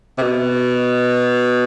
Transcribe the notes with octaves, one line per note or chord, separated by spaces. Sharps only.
C3
B2